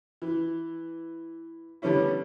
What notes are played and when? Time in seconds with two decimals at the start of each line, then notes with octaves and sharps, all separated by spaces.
0.22 E3
1.82 D3 G3 B3 C#4 E4